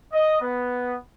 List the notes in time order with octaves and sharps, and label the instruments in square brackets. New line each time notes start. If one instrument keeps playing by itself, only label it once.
[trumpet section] D#5
B3